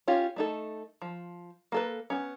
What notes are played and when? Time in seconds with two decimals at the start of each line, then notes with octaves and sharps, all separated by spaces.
0.08 C#4 F4 G4
0.36 A3 D#4 A4
1.02 F3
1.72 A#3 A4 B4
2.10 B3 C#4